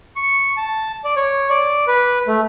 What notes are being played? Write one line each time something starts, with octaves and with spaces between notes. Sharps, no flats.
C#6
A5
D5
C#5
D5
B4
A3